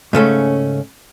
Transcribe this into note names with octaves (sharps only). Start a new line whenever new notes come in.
G#2 C#3 A3 C#4